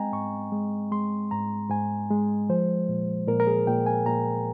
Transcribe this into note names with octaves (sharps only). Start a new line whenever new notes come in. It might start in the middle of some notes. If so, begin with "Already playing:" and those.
Already playing: G#3 C4 D#5 G5 G#5 A#5
G#2 C#6
G#3
G#3 C6
G#2 A#5
G#2 G#5
G#3
F3 C5
A#2
A#2 A#4
A#4
G#4
A#2 G5
G#5
A#2 A#5